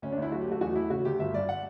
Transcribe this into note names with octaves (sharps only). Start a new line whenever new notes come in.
D2 C#4
D4
D2 E4
F#3 F#4
G4
A3 F#4
E2 F#4
A3 E4
C#3 F#4
D2 G4
G1 E5
G2 D5
F#5